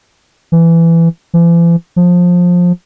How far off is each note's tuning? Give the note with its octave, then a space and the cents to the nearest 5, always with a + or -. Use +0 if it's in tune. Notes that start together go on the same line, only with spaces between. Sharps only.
E3 +15
E3 +45
F3 +20